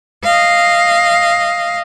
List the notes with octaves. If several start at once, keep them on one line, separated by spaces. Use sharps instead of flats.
D#5 F5